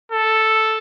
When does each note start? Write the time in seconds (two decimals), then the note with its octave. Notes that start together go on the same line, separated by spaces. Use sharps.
0.12 A4